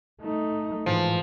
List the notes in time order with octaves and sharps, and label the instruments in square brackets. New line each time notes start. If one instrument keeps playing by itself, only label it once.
[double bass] A3 D#4
[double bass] G#2 E3 [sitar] F3